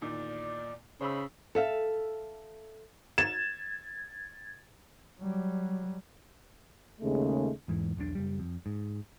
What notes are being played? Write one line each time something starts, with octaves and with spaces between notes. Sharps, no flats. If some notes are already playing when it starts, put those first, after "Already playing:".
E2 A#2 D#3 D5
C#3 D#4 C5 B5 E6
A4 E5 F5
G#6 A6 E7
F#3 G3
D#2 C#3 G#3 A3
E2 G#2 E3
E1 B1 C3 D4
F#1 G3
F2
G#2